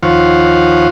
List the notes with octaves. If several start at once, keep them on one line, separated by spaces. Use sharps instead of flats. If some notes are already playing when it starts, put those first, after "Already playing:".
D#2 F3 F4 C5 C#5 F#5